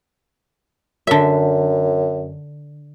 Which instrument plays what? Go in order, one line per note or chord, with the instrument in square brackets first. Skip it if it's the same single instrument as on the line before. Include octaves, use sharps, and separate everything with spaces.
[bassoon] F#2 [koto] D3 E5